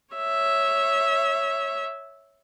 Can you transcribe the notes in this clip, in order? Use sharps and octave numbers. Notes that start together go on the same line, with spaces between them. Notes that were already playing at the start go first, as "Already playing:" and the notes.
C#5 E5